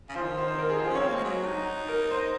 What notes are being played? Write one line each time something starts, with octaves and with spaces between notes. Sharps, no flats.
C#3
F3 C5
D#3
C5
C5
A#4
G#4
F3 C5
C#4
C#5
C4
A#3 C5
G#3
F#3
D#4
A#4
C5